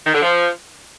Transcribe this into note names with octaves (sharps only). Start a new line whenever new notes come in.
D#3
D3
F3